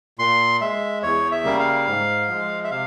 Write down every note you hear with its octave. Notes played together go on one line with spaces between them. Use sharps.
A#2 C6
G#3 E5
E2 C#5
E5
C#3 G3 A#3
F5
G#2
F3 G#3
E5
C3 F5